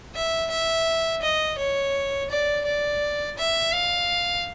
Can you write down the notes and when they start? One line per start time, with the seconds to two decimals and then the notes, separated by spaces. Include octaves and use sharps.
0.15 E5
0.50 E5
1.22 D#5
1.58 C#5
2.30 D5
2.65 D5
3.37 E5
3.73 F5